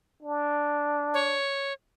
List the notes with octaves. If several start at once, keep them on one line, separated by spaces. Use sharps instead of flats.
D4
C#5